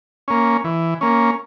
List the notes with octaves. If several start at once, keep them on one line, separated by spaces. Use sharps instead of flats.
A#3 C#4
E3
A#3 C#4